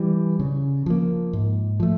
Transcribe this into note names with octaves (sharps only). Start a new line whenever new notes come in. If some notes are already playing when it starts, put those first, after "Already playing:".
Already playing: E3 G3
C#3
F3 A#3
G#2
F3 A3